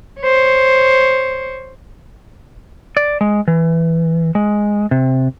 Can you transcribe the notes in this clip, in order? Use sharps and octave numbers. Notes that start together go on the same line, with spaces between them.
C5 C#5
D5
G#3
E3
G#3
C3